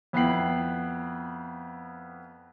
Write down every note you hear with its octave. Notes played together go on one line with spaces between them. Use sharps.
F2 B3 E4 G5 C7 F#7